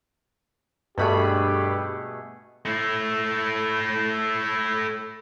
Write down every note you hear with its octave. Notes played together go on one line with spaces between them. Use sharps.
G2 B2 A3 G4 G#4 B5
A3 E4